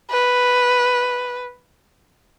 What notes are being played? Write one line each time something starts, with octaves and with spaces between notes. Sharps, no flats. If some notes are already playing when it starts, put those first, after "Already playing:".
B4